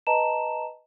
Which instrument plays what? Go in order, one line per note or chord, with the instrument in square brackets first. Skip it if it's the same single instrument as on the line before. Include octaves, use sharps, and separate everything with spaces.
[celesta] B4 D#5 A5 A#5 E7